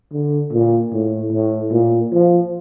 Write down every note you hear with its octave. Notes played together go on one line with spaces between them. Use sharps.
D3
A#2
A2
A2
A#2
F3